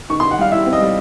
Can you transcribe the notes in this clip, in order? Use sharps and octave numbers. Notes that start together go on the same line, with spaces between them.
D#3 C#6
C6
D#3
F#5
G3 F5
E4 E5
C4
D#5
G3